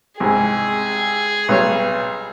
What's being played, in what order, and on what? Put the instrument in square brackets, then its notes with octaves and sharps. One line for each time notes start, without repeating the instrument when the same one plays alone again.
[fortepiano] C2 G#2 [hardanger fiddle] G#4
[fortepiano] B1 G3 C#5